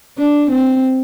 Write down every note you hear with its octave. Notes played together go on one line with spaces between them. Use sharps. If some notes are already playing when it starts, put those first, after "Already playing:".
D4
C4